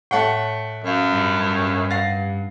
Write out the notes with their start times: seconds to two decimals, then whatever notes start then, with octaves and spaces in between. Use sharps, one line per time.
0.11 A2 A3 C#5 F#5 G5 A5
0.84 F#2 C#4 F5
1.12 G2
1.91 F5 F#5 A6 A#6 C7